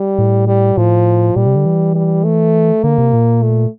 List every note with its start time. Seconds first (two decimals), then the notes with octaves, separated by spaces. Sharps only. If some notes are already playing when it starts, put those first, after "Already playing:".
Already playing: G3
0.18 A2
0.48 G3
0.77 A2 F3
1.36 A#2 G3
1.46 C3
1.56 D3
1.66 E3
1.96 G3
2.24 A3
2.84 D3 A#3
2.98 C3
3.13 A#2
3.43 A3